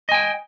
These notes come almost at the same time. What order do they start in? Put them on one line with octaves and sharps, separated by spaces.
D#5 G#5 G5